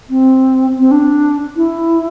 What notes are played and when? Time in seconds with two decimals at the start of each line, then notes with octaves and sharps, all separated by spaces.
0.10 C4
0.79 C4
0.91 D4
1.56 E4